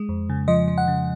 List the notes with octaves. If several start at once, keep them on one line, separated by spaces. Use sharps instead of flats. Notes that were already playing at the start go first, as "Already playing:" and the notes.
Already playing: G#3
F2
C#3
F3 D#5
F3
F#5
C#3